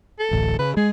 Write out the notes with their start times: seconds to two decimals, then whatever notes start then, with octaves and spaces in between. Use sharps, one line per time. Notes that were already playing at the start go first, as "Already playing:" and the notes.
0.19 A4
0.31 D1 A1 D2
0.59 C#3 B4
0.77 G#3 G#4